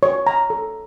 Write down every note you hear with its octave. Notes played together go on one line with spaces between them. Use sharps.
C#5
A#5
A4